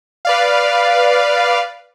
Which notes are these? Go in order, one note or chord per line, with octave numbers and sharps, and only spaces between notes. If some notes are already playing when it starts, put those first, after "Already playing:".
B4 D5 F5